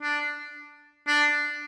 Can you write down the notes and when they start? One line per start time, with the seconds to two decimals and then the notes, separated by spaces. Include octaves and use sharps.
0.02 D4
1.08 D4